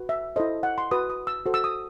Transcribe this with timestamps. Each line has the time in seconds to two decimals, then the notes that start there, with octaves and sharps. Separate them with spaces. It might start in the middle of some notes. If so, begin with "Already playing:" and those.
Already playing: F#4 B4
0.09 E5
0.36 E4 A4 C5 D#5
0.63 F#5
0.78 C6
0.91 F#4 B4 D#6
1.10 D#6
1.27 E6
1.46 F#4 A4 C5
1.54 E6
1.64 D#6